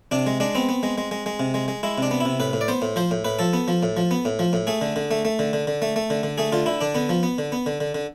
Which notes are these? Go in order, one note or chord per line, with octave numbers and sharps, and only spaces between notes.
C3 D4
G#3
G#3 D4
B3 C4
B3
G#3
G#3
G#3
G#3
C3
G#3
G#3
G#3 E4
C3 D4
B3
C3 E4
A2 B4
A2
D5
B3 C5
A2
F3 C5
A2
A2 B4
F3 A4
B3
F3
A2
F3
B3
A2
F3
A2
A3 G#4
D3
D3
A3
A3
D3
D3
D3
A3
A3
D3
D3
A3 G#4
D3 F4
D3 E4
D3 D4
D3 B3
F3
B3
D3
B3
D3
D3
D3